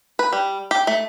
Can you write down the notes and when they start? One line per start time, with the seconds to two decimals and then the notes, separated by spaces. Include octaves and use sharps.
0.19 B4
0.33 G3
0.71 G4
0.87 A3